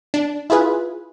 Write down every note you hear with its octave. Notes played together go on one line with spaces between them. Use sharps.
D4
E4 F4 G#4 B4